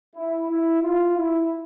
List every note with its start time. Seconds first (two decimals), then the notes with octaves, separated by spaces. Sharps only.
0.15 E4
0.49 E4
0.82 F4
1.16 E4